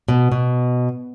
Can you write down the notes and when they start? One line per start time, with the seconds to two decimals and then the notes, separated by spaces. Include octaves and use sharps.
0.08 B2
0.32 B2